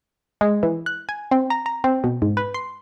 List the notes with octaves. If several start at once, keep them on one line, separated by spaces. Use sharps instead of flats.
G#3
E3
F#6
G#5
C4
A#5
A#5
C4
B2
G#2
B4
C6